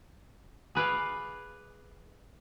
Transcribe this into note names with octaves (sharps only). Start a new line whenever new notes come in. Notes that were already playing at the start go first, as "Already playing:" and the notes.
G#4 B4 D5 F5